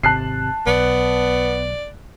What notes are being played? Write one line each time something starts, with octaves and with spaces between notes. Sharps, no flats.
G#1 C3 A5 F#6 C7
B1 B3 D5